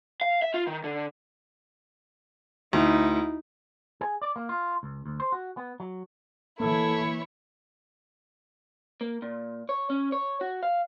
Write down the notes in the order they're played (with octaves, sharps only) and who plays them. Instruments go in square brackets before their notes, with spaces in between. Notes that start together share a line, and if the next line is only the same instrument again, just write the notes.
[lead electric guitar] F5
E5
F4
D#3
D3
[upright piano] D2 [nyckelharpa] D#4 E4
[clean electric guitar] G#4
D5
A#3
F4
C#2
D2
C5
F#4
B3
F#3
[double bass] E3 [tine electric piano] A#3 [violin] E4 C#5 [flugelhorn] A4
[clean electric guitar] A#3
A#2
C#5
C#4
C#5
F#4
F5